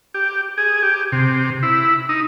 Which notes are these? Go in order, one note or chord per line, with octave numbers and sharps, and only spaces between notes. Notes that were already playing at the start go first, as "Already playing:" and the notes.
G4
G#4
G4
C3
E4
D#4